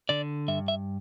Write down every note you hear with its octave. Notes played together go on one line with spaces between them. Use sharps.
D3 D5
G2 E5
E5